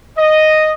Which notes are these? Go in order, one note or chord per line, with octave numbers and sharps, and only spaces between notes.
D#5